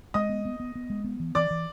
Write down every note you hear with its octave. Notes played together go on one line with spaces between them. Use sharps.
G#3 D#5 D#6
B3
B3
B3
B3
G#3
B3
E3
E3 D5 D6
E3